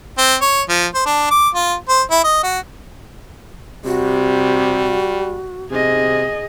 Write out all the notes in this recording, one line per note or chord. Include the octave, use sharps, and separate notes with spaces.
C4
C#5
F3
C5
D4
D6
F4
C5
E4
D#5
F#4
C3 G3 F#4
C3 G#4 D#5